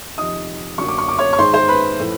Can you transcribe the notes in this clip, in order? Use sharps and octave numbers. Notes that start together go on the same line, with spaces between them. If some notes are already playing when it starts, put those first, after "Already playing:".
F2 C3 D#3 D#5 D#6
F#2 D3 F#3 A#3 C#6
D6
C#6
D6
C#5 C#6
C#6
G#2 D#3 G#3 C5 C6
C5 C6
B4 B5
A2 F3 A3